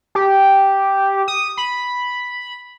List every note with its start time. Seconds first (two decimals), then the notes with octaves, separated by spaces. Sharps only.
0.15 G4
1.28 D#6
1.57 B5